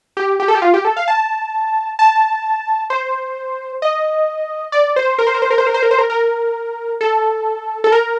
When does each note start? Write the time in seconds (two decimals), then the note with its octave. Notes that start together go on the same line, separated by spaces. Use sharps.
0.17 G4
0.40 G4
0.48 A4
0.55 G4
0.62 F4
0.74 G4
0.85 A4
0.97 F5
1.08 A5
1.99 A5
2.90 C5
3.82 D#5
4.72 D5
4.96 C5
5.18 A#4
5.27 C5
5.34 A#4
5.42 C5
5.50 A#4
5.58 C5
5.67 A#4
5.74 C5
5.83 A#4
5.91 C5
5.98 A#4
6.10 A#4
7.01 A4
7.84 A4
7.92 A#4